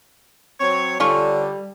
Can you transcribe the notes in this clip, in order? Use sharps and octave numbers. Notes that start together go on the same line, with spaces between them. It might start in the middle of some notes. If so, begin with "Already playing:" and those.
F#3 C4 C#5
D3 G3 C#4 F4 C#6